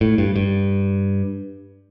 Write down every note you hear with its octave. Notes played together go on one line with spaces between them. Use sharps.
A2
G2
G2